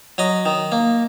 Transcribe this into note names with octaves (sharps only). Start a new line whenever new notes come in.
F#3 D#5
D#3
A#3